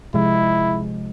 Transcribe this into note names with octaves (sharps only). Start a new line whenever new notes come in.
C3 F3 G#3 E4